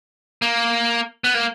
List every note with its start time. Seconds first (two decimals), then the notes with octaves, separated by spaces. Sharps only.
0.42 A#3
1.24 B3
1.34 A#3